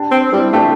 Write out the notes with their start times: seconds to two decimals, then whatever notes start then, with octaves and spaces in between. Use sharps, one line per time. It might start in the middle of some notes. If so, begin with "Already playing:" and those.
Already playing: D4 G4
0.11 C4
0.32 G3 C4 E4
0.53 A3 D4 G4